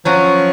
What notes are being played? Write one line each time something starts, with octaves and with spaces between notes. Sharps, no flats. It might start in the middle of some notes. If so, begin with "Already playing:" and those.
F3 F#3 C#4 F#4